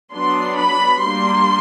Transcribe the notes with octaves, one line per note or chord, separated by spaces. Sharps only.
F#3 B3 D4 C6
B5
G3 A#3 D4 C6